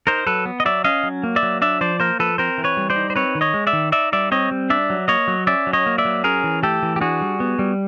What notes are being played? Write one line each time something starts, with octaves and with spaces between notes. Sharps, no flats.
D#4 A#4 C5
F#3 A4 B4
B3
D#5
F#3 D5 E5
C#4 D#5 F5
F#3
A#3
D5 E5
F#3
D4 D5 E5
F3 C5 D5
A#3 A#4 C5
F3 A4 B4
C4 A#4 C5
E3
B4 C#5
G3
C5 D5
D#4
C5
C4 B4 C#5
D#3
C#5 D#5
G#3
D5 E5
D#3
D#4 D5 E5
G3 D5 E5
C4 C#5 D#5
G3
D4 D5 E5
F#3
A#3 C#5 D#5
F#3
C#4 D5 E5
F#3
C#5 D#5
A#3
D5 E5
F#3
C#4 G#4 A#4
E3
A3 G4 A4
E3
G4
D4 F#4 G#4
G3
B3
G3